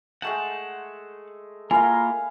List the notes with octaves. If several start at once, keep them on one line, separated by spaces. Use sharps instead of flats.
G#3 A3 F#5 G5 A5
A#3 E4 F4 A#4 F5 G#5